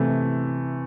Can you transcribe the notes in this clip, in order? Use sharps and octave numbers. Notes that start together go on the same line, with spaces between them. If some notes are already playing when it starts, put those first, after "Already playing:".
Already playing: C3 E3 A3